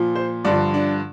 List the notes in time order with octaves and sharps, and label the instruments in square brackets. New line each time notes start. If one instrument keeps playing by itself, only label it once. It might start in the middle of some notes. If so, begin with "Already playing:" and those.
Already playing: [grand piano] A#2 F3
C5
G2 D3 F3 D5
D4